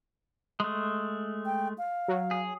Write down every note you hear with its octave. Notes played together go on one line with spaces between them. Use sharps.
G#3 A3
G5
F5
F#3
G#4